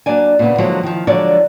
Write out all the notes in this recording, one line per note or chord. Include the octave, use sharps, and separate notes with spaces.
F#3 A#3 D4 D5 G#5
A#2 C#3 A#3 B3
D3 F3 F#3 G#3 A#3
D#3 F3
D3 F3 F#3 G#3 C#5 D5